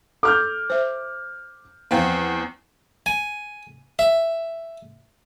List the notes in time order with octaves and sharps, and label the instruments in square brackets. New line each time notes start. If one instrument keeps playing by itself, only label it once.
[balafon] A4 [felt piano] D6 F6 G6
[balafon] C5 E5
[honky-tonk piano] E2 C4 [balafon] F3 F5
[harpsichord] G#5
E5